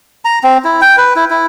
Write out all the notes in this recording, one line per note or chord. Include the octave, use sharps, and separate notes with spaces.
A#5
C4
E4
G5
B4
E4
E4